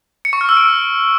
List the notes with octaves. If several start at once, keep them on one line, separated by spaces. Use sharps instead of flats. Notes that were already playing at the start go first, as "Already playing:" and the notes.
C#7
C#6
F6
E6
D7